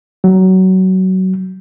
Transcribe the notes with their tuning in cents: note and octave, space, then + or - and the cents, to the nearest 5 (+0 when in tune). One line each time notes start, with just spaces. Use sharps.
F#3 +20